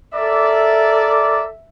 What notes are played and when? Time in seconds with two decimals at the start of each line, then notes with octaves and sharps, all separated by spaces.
0.15 A4 A#4 D5 E5